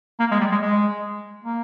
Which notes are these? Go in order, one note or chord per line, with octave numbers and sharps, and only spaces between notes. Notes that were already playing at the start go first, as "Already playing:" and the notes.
A#3
G#3
G3
G#3
G#3
A#3